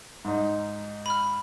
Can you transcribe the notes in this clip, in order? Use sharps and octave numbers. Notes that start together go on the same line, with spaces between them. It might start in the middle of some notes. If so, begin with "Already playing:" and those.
G#2 D#4
B5 F6